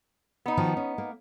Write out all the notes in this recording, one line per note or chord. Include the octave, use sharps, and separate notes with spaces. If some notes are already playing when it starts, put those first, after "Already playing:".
B3 D#4
D#3 F3 F#4
C#4
A#3